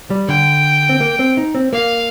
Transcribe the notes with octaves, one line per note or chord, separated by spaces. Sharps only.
G3
D3 G5
C4
A#3
C4
D#4
C4
A#3 F5